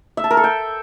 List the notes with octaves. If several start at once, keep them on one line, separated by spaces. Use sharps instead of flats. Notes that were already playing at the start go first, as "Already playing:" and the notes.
E5
A5
A#4
A4
G5